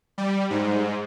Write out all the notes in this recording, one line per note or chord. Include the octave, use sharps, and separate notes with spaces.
G3
G#2